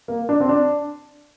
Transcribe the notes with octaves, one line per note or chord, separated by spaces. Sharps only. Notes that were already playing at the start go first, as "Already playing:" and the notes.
A#3
D4
C4
D4